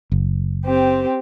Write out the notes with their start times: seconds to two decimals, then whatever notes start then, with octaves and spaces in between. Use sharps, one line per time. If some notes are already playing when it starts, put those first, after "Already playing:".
0.12 F#1
0.64 C4 G4